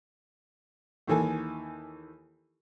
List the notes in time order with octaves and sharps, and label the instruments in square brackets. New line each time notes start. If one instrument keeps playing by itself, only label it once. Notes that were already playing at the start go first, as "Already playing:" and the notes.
[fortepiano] D#2 D#3 E3 A4 G#5